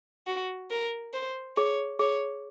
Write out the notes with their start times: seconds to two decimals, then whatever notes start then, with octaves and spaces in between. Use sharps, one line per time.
0.27 F#4
0.71 A#4
1.13 C5
1.57 G#4 C#5
1.99 G#4 C#5